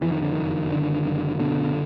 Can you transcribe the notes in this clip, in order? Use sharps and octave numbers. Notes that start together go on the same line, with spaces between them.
F2 E3
D#3
D3
F#1 D#3
D3
F#1
B2 D3